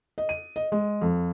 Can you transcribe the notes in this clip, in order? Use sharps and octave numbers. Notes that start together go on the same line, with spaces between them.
D#5
D#7
D#5
G#3
F2